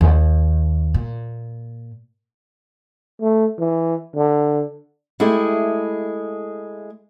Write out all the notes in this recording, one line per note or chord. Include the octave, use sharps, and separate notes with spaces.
D#2
A#2
A3
E3
D3
G#3 A3 E4 G4